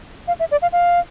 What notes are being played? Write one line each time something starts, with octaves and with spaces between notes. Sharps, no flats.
F5
E5
D5
F5
F5